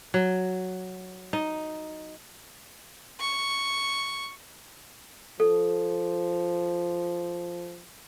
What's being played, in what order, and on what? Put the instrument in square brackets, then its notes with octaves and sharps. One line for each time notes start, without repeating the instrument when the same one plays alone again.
[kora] F#3
D#4
[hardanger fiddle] C#6
[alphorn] F3 [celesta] A4